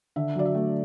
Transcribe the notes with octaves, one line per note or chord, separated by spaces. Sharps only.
D3 E5
F#3 D5
E5
A3